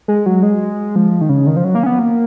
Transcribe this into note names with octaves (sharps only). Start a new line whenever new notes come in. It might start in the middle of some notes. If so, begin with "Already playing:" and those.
G#3
F#3
G#3
F3
D#3
C#3
D#3
F3
F#3
A#3
C#4
B3
A#3